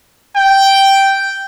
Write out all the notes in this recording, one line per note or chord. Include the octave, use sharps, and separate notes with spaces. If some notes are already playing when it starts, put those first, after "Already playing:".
G5